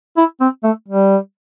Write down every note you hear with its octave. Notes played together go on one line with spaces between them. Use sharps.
E4
C4
A3
G3